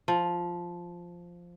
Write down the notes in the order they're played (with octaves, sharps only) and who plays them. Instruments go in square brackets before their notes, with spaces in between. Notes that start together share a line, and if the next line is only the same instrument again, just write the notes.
[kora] F3